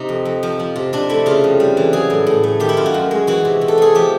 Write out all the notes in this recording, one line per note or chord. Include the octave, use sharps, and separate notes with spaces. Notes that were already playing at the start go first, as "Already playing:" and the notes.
Already playing: C3 D#4
F2
F2
F3
F3
C3
C3 D4
A3 E4
C#3 F4
F2
G3
E3
F#3 G#4
A2
A2
A3
D#3 G4
E4
F#2 F4
F#4
F#2
G#3
E3 F#4
C3
C3
A4
A3 G#4
F3 G4